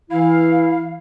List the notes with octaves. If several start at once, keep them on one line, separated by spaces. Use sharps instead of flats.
E3 E4 F5